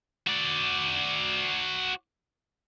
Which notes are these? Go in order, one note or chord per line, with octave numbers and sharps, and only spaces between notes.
F#4 D5